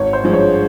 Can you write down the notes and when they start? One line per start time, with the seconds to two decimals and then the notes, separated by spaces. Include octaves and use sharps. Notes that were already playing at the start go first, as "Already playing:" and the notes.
Already playing: G#1 C#5
0.13 C5
0.24 G2 F3 G#3
0.34 C#5